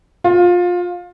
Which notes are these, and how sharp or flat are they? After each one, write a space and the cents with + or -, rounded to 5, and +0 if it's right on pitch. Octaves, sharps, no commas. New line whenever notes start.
F4 +20